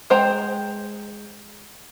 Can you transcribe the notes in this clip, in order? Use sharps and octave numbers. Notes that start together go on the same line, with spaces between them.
G#3 C5 G5 A#5